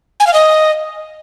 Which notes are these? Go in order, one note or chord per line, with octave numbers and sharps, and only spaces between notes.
G#5
F5
D#5